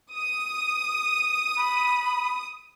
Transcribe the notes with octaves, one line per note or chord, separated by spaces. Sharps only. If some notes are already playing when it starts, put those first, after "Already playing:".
D#6
B5